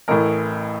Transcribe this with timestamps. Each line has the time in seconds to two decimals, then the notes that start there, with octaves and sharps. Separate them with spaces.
0.08 A1 A2 E3 A#4